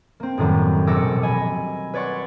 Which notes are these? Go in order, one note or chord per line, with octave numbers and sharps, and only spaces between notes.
A#3 C4
F#2 A2 D#3 F#3 G3
E1 A#1 D6 E6 A#6 C#7
D#5 G#5 B5
B4 C#5 D5 F#5 C6 C#6